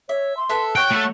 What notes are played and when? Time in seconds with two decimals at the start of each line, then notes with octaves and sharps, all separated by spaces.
0.09 C#5 E5
0.37 C6
0.49 A4 B4 E5
0.75 F#4 C#5 G5 F#6
0.91 A3